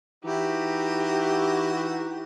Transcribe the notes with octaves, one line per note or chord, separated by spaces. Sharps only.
E3 D#4 E4 F#4 G4